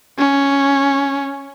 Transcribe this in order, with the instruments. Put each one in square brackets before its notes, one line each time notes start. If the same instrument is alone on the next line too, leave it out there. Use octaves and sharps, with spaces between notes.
[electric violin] C#4